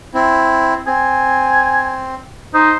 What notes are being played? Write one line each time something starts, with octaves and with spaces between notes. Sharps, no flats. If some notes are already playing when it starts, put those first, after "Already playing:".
C4 E4
C4 G#5
D#4 C5